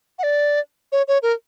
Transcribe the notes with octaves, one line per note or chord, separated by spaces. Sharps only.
F#5
D5
C#5
C#5
A#4